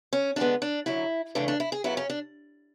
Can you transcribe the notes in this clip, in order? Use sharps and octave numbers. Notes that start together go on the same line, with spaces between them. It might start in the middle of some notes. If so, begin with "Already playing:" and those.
C#4
D2 D3 G#3 B3 D4
D4
F#2 D3 F#3 E4
E2 C#3 E3 A3 D4
D4
E4
G#4
F#2 C#3 F#3 B3 E4
C#4
D4